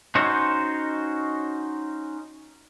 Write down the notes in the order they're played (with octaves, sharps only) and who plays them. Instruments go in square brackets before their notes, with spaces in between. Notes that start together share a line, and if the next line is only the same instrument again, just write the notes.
[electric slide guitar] C#4 D#4 F#4 C5 C#5